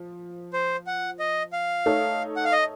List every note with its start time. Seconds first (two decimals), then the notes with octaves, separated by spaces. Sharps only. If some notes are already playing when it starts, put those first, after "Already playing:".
Already playing: F3
0.53 C5
0.87 F#5
1.19 D#5
1.53 F5
1.86 A3 D#4 A4 C#5
2.36 F#5
2.45 F5
2.52 D#5